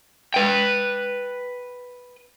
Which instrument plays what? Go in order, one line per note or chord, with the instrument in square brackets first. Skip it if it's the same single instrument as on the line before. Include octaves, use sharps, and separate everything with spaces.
[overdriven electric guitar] B4 G5